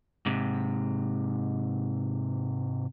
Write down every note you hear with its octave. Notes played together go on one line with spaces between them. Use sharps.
G#2 C3